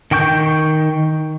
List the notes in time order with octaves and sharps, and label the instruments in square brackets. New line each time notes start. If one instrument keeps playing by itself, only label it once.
[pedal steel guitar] D#3 G5 C#6 G6